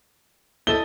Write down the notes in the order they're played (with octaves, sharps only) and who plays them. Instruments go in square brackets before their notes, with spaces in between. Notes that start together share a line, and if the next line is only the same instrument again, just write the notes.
[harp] E4 A4 D#5 [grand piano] G7